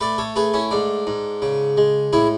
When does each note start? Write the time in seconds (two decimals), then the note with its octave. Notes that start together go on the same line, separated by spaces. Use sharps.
0.01 A3 B4 D5
0.18 A4 C#5
0.36 A3 G#4 B4
0.53 C#4 E4
0.71 G#2 D4
1.07 G#2
1.42 C#3
1.77 G#3
2.13 A2 E4 G#4